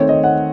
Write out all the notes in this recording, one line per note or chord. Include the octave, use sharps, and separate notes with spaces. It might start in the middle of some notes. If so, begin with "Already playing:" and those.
Already playing: D#3 A3 C4 C#5
D#5
F#5